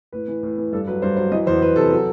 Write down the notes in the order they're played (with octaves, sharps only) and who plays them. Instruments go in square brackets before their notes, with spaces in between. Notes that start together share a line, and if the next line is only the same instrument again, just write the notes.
[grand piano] A2 B4
E3
A2
E3
G2 A4
F#3 B4
G2 C5
F#3 C5
E3 D#5
E2 C5
E2 B4
C3 A4
F#3